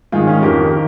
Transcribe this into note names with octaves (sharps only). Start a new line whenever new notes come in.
G#2 D#3 F4 G#4
C#4 F4
F2 D#3 G4 A#4
D#3